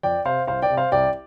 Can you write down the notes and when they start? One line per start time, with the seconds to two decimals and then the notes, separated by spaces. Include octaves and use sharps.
0.03 F2 D5 G5
0.25 C3 C5 F5
0.47 C2 C5 F5
0.62 D5 G5
0.70 C3
0.77 C5 F5
0.92 C2 D5 G5